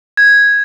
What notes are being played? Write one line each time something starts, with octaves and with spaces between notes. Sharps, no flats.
G#6